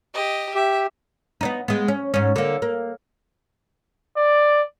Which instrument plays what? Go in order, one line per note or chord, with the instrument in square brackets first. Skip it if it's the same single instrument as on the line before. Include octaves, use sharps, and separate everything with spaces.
[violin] G4 D#5
[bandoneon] G4 [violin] E5
[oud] B3 D4 D#4
G#3 B3
C#4
G#2 C#4
D3 A#3
A#3
[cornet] D5